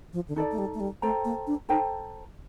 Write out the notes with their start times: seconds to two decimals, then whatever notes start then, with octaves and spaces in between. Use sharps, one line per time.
0.13 F3
0.28 D3
0.36 D#3 D#4 A4 D5
0.52 A3
0.58 G3
0.74 A3
0.80 G3
1.02 A3 A4 C5 G5 A#5
1.25 A#3
1.47 D4
1.69 D#4 A4 C5 G5 A#5